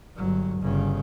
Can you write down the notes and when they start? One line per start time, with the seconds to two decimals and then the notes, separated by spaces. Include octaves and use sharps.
0.16 G1 F#3
0.62 G1 C#3